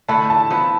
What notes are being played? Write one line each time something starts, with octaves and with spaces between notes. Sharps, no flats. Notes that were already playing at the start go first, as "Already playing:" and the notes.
D3 A3 E4 A5
A5
F3 B3 E4